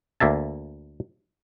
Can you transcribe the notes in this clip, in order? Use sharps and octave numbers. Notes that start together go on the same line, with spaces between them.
D2 A#3 E5 A5